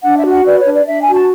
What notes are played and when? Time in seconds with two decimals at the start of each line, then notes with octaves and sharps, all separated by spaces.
0.03 D4 F#5
0.17 E5
0.24 F#4
0.30 F#5
0.45 B4 D5
0.59 C#5
0.65 D4
0.73 D5
0.86 D4 E5
1.01 G#5
1.07 F#4
1.14 A5